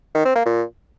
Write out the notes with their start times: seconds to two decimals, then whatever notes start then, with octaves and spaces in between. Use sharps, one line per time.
0.15 D#3
0.25 C4
0.35 A#3
0.45 A#2